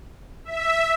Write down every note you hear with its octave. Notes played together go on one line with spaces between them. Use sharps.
E5